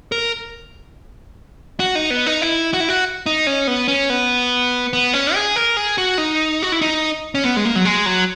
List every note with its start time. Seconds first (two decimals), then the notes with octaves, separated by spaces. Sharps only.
0.12 A#4
1.80 F#4
1.95 D#4
2.10 B3
2.26 D#4
2.42 E4
2.74 F#4
2.80 E4
2.89 F#4
3.26 D#4
3.47 C#4
3.67 B3
3.88 C#4
4.10 B3
4.93 B3
5.14 C#4
5.34 G#4
5.56 A#4
5.77 G#4
5.98 F#4
6.18 D#4
6.63 F#4
6.72 E4
6.81 D#4
7.35 C#4
7.44 B3
7.57 G#3
7.65 A#3
7.76 F#3
7.85 G#3
8.06 F#3